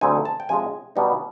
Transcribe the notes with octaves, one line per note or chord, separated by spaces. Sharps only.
D2 D3 G3 C4 D#4 G#5
A5
G5
C3 F3 G#3 G#5
B2 G3 B3 D#4